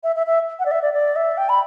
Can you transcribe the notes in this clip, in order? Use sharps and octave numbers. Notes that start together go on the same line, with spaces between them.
E5
E5
E5
F#5
D5
E5
D5
D5
E5
G5
B5